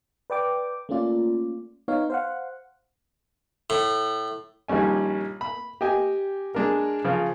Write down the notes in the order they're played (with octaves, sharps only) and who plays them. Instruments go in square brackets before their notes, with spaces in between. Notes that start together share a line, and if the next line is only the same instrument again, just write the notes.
[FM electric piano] B4 D5 G5 D6
A3 A#3 C#4 F4 D5
B3 D#4 C#5 F5
C5 F5 F#5
[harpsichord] A2
[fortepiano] A#1 D#3 G3 C#4 G#5
B5
G4 D#5 G5 G#5
G#3 D4 A#4
C#3 F3